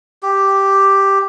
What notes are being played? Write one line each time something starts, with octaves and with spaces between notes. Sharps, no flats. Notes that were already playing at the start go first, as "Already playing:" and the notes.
G4